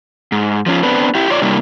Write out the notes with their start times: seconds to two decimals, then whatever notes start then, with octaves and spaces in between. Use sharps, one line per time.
0.32 G#2
0.66 F3 C#4 F4
0.83 B3 C4 D4 B4
1.15 E4 G4
1.30 F4 C#5 D5
1.42 C3 G3 A#3 D4 E4